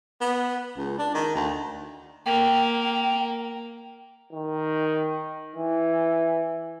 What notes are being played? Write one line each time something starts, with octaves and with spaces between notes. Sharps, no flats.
B3
C#2
D4
D#3
D2
A#3 G5
D#3
E3